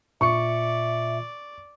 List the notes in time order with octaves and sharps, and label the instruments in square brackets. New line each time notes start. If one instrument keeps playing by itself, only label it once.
[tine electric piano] A#2 F4 C#7 [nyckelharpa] D5 [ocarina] E5 [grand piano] C#6